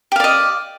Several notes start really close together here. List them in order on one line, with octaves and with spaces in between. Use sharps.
G4 F5 D5 D#5